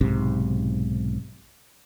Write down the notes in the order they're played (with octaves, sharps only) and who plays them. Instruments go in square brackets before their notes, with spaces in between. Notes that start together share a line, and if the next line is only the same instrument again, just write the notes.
[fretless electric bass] B1 G#2 C3